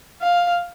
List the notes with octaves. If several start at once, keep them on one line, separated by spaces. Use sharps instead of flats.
F5